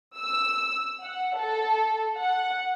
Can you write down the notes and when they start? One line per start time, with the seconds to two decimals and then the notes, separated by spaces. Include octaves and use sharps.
0.18 E6
1.04 F#5
1.36 A4
2.19 F#5